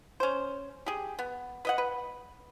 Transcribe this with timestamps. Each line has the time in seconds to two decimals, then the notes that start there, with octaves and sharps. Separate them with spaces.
0.20 C#4 C5
0.86 G4 G#4
1.19 B3
1.65 B4 D#5 F#5
1.78 B4